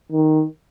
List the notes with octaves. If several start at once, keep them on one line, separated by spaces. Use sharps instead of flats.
D#3